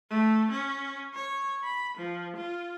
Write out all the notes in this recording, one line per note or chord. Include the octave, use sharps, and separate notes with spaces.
A3
C#4
C#5
B5
F3
F4